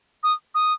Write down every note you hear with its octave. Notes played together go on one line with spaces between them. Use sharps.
D#6
D#6